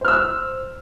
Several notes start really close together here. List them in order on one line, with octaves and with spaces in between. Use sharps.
C5 F6 E6